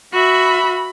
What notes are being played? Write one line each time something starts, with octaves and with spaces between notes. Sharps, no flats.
F#4 E5 B5